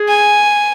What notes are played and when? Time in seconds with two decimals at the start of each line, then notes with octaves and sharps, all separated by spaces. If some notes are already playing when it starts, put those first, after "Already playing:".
Already playing: G#4
0.08 G#5